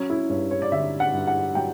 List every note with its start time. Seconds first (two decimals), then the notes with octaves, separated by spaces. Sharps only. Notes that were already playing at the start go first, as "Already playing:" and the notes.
Already playing: F#3 C#4
0.10 E4
0.30 G2 C#5
0.51 C#5
0.62 D5
0.72 D3 E5
1.00 F#5
1.13 G2
1.27 F#5
1.55 F#3 G5